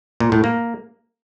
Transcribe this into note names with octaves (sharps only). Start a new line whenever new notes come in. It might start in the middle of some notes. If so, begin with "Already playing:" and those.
A#2
A2
A#3